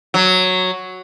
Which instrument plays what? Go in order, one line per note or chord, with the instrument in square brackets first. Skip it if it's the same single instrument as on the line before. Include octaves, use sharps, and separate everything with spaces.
[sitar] F#3